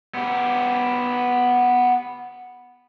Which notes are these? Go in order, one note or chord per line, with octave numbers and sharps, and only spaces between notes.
B3 G4